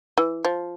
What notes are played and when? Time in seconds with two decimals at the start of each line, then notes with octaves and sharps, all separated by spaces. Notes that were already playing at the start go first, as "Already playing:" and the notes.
0.18 E3
0.45 F3